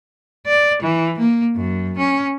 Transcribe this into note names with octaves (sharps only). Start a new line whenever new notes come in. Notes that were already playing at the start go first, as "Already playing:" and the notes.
D5
E3
A#3
F#2
C#4